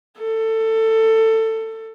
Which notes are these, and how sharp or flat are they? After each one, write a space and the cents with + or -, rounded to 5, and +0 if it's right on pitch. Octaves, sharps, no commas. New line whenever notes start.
A4 +20